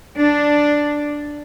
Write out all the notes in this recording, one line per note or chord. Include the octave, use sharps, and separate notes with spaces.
D4